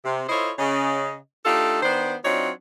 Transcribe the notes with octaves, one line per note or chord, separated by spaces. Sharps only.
C3
E4 F4 A4 C5 C#5 D#5
C#3 C#4 D#5
A3 D4 D#4 F4 G4 A4
D#3 B3 D4 C5
F#3 C4 D4 D#4 F4 C#5